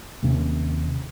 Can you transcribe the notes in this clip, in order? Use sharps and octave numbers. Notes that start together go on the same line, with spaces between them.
D#2 C3 C#4